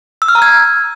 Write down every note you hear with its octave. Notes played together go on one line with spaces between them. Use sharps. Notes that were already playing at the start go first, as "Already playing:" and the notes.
E6
F6
A#5
G#6